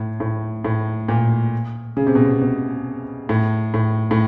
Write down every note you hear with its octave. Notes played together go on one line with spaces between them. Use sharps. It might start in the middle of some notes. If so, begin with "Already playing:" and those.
Already playing: A2
A2
A2
A#2
C#3
C3
B2
C3
B2
A2
A2
A2